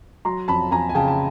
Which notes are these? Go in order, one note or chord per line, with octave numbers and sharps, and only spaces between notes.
F#3 A#5 C6
F2 A5 B5
F2 G#5 A#5
G#5
C#3 G5 A5
A5